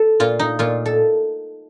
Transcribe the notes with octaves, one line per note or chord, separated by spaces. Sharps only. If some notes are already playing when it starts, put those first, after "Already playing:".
Already playing: A4
A#2 F4
D#4
A#2 F4
A4